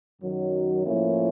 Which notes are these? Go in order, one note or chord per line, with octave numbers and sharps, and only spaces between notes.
F#2 D#3 F#3
A2 F3 A#3 C#4 E4